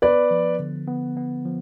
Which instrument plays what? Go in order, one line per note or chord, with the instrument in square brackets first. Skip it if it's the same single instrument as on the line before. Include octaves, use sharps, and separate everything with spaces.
[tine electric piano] B3 [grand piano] B4 D5
[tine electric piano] F3
D3
B3
B3
F3